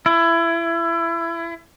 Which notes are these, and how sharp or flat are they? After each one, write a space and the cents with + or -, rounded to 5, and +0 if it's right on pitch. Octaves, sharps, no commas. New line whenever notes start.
E4 +25